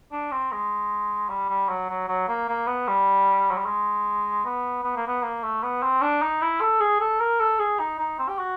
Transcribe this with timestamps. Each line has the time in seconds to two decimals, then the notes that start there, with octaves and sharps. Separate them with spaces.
0.12 D4
0.32 C4
0.52 G#3
1.29 G3
1.49 G3
1.69 F#3
1.89 F#3
2.08 F#3
2.28 A#3
2.48 A#3
2.67 B3
2.88 G3
3.51 F#3
3.57 G3
3.66 G#3
4.45 B3
4.84 B3
4.96 A#3
5.07 B3
5.23 A#3
5.44 A3
5.63 B3
5.83 C4
6.01 D4
6.22 D#4
6.42 E4
6.61 A4
6.80 G#4
7.01 A4
7.20 A#4
7.40 A4
7.59 G#4
7.79 D#4
7.99 D#4
8.18 C4
8.29 G4
8.39 F#4